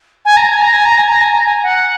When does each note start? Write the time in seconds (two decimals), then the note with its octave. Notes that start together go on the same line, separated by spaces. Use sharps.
0.25 G#5
0.37 A#5
0.49 G#5
0.62 A#5
0.73 G#5
0.85 A#5
0.98 G#5
1.09 A#5
1.21 G#5
1.33 A#5
1.45 G#5
1.63 F#5